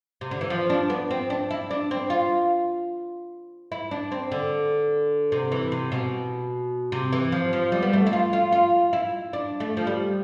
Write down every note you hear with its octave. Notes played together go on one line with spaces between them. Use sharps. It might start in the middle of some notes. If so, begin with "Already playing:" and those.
C3
D3
E3
F3
D4
B3
C4
D4
E4
D4
C4
F4
E4
D4
C4
D3
C3
E3
C3
B2
C3
E3
F3
F3
G3
B3
A3
E4
F4
F4
F4
E4
D4
A3
F3
G3